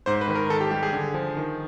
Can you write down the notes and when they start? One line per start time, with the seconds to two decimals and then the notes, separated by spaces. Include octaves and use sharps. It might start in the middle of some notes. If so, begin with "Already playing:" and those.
0.06 G#2 C5
0.21 B4
0.28 D#3
0.35 A#4
0.50 D#3 A4
0.61 G4
0.71 G3 G4
0.83 G#4
0.93 D3
1.14 F3
1.37 D#3